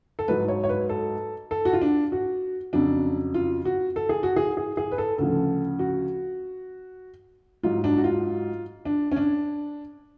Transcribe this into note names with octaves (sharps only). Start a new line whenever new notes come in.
A4
G#2 F#3 B4
C#5
C#5
B4
A4
A4
F#4
F4
D4
F#4
F2 C#3 F#3 D4
F4
F#4
A4
G#4
F#4
G#4
G#4
G#4
B4
A4
D2 C#3 F3 A4
F#4
G#2 F#3 F4
D4
F#4
F4
D4
C#4
D4